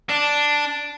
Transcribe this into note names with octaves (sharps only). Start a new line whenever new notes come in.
D4